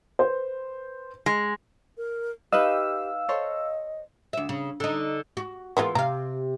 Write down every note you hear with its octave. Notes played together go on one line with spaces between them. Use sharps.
B4 C5
G#3
A#4
D#4 G4 B4 D#5 F5 E6
A4 C5 C#5 D#5
D2 E5
C#3
D3 D#4
F#4
E3 G#3 A#3 B3 F4
C3 F5 A#5